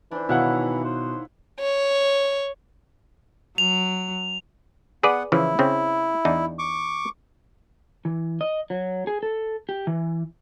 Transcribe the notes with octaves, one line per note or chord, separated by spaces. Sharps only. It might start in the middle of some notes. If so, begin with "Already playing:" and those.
E3 D4 C5
B2 D#3 E4 C#5 F5 F#5 F#6
C5
C#5
F#3 F7
B3 G#4 B4 D5 F#5
C#3 E3 F3 E4
C#3 C4
E2 D4 D#4
C#6 D6
E3
D#5
F#3
G#4
A4
G4
E3